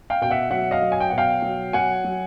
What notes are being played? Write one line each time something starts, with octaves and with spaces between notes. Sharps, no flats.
F5 G5
B2 G5
E5 F#5
F#3 E5 F#5
D#5 F5
F#3
G#5
G5
B2 F#5
F5 G5
F#3
F#3 F#5 G#5
F#3